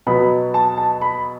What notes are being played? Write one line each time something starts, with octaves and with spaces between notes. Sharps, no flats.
B2 F#3 B3 B5
A5
A5
B5